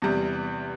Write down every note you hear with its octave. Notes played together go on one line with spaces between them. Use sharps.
E2 C3 G3